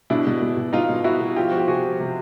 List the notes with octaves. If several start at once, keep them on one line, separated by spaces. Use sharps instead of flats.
B2 D4 E4
B2
B2
B2
B2 D#4 F4
B2
B2 E4 F#4
B2
F3 F4 G4
F3 F#4
G4
C3 F#4 G#4
F3
C3